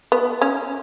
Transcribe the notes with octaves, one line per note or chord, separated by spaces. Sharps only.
B3
C#4